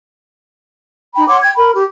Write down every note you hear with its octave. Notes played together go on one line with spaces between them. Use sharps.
D#4 G5 B5
C#5 F#5 C6 D6
G5 G#6
A#4 B5
G4